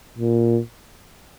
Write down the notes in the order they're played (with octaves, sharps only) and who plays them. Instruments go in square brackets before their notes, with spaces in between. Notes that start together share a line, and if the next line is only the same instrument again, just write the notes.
[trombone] A#2